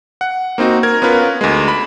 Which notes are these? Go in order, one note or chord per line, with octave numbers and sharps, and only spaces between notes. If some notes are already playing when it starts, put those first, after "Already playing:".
F#5
A#3 C4 D#4 F#4
A#4 G#6
B3 C#4 F4 A#4 B4
D2 G#3
B5